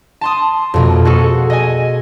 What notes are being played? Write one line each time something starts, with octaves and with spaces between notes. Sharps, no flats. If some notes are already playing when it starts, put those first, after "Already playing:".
A5 C6 D#6
F2 B2 A#3
F#4 G#4 A4
D#5 G#5